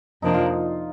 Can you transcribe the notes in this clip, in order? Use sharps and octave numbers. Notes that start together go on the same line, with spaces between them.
F2 C3 F3 A#3 D4 D#4
F4
D#4